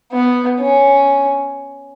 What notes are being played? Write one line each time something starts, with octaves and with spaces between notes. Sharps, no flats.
B3
C#4